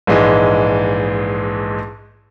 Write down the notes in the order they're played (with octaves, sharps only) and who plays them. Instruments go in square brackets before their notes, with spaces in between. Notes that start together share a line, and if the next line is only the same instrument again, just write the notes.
[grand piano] A#1 G#2 E3 G#3